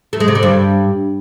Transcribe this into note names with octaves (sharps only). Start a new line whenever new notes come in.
A3
G#3
C3
D3
G2